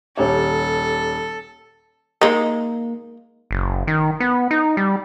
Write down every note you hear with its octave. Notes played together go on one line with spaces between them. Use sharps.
D#1 G4 A4 C#5
G#3 A#3 D#4
F#1
D#3
B3
D#4
G3